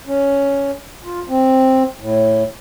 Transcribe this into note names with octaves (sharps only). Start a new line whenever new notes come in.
C#4
F4
C4
A2